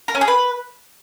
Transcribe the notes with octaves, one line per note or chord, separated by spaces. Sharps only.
A#4
C#4
G#4
B4